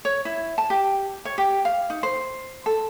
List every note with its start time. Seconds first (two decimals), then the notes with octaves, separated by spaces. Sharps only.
0.05 C#5
0.25 E4
0.58 A5
0.70 G4
1.25 C#5
1.38 G4
1.65 F5
1.90 D#4
2.03 C5
2.66 A4